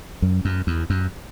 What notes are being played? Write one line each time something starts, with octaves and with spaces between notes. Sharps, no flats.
F#2
F#2
E2
F#2